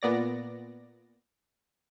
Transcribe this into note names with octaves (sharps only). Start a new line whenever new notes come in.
A#2 B3 D5 A#6